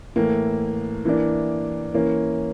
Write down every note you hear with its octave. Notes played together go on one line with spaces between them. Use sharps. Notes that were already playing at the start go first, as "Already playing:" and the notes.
A2 E3 A#3
E3 A#3 D4
E3 A#3 C#4